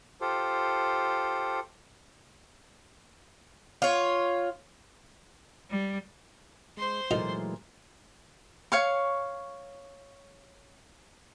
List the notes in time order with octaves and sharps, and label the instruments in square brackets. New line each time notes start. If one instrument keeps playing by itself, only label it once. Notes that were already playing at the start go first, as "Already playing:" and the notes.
[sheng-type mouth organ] F4 G4 A4 C5
[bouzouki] F4 C#5
[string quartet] G3
[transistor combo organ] G#3 [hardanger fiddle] C5 C6
[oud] A#2 A3 [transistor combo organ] E3 F#3 G#3 [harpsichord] D#4 F4 A#4
[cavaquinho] C#5 F5 C#6